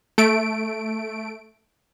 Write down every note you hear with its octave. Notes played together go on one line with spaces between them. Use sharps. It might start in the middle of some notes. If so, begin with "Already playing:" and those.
A3 D7